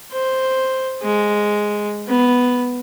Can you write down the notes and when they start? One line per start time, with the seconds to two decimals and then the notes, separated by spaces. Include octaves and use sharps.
0.11 C5
1.02 G#3
2.08 B3